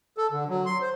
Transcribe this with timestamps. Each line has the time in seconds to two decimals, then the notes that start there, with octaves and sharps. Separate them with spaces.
0.18 A4
0.31 D3
0.48 F#3
0.66 C6
0.81 C5